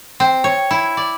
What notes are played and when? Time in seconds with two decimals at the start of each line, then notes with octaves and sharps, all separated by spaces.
0.20 C4
0.44 C#5
0.71 E4
0.97 D5